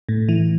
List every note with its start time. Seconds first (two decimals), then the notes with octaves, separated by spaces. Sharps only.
0.09 A2
0.29 E3